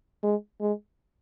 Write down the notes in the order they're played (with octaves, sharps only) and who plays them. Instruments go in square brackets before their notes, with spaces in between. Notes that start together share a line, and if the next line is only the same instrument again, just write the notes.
[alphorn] G#3
G#3